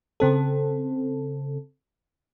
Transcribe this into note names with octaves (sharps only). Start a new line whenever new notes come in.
C#3 C4 A4